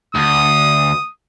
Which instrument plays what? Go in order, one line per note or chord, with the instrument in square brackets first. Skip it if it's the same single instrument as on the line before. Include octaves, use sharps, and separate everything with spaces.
[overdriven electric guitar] D2 [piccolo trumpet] D#6